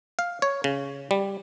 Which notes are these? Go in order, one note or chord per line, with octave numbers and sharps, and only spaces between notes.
F5
C#5
C#3
G3